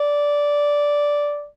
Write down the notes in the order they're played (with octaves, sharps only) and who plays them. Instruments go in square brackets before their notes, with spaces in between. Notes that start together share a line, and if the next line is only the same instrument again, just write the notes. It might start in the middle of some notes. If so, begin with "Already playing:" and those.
Already playing: [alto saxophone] D5